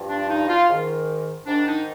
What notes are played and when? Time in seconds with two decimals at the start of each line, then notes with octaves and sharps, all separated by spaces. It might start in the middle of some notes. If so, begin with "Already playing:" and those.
Already playing: G2 F3
0.08 D4
0.29 D#4
0.48 F4
0.68 G#2 D#3
1.46 G#2 D#3 D4
1.67 D#4